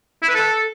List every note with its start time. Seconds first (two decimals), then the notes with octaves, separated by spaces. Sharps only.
0.22 E4
0.28 B4
0.35 A4